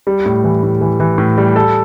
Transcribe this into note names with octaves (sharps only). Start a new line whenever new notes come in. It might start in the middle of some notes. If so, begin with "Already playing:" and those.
G3
A2
E3
A2
E3
E3
A2
G3
A4